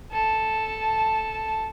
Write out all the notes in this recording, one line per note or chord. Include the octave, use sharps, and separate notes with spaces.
A4 A5